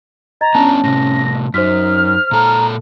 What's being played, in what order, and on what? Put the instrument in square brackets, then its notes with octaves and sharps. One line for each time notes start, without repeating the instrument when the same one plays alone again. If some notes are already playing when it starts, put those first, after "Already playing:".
[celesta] D#5 G#6 A6 [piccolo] A#5
[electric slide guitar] B3 D4 [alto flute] C#4 [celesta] A5
[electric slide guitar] A2 C3 [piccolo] A#6
[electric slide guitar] F#2 [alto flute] D#4 [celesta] C5 B6 [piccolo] F6
[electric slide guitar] A#2 A4 [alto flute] A#5